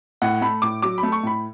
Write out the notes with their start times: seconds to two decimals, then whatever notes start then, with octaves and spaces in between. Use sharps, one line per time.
0.22 A2 F#5
0.41 A3 B5
0.62 A2 D6
0.82 F#3 D6
0.98 B5
1.03 A3
1.12 C#6
1.23 A2 B5